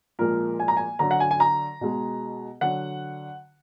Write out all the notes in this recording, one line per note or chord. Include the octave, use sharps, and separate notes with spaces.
A#2 F3 G#3 A#4
G#5
A#5
G#5
D3 F#3 A#5
F#5
G#5
G#5
A#5
B2 G#3
D3 F#3 F#5